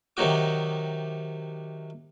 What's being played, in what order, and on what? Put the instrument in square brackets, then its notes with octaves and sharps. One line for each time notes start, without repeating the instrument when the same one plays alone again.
[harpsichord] C3 D#3 F#3 D#4 F#4 D6